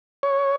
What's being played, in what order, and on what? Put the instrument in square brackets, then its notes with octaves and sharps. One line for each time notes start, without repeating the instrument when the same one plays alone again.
[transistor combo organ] C#5